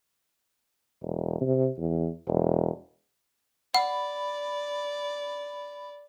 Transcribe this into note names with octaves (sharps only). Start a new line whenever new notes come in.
E1
C3
E2
E1
D5 F#5 B5